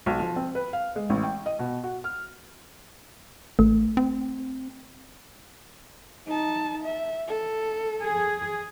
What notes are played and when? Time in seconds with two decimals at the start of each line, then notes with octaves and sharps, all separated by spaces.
0.06 B1
0.20 F3
0.36 C4
0.55 B4
0.73 F5
0.96 G#3
1.10 A1
1.23 G5
1.46 D#5
1.59 B2
1.84 F#4
2.04 F6
3.59 A1 A3
3.97 C4
6.26 D#4 A5
6.83 E5
7.28 A4
8.01 G#4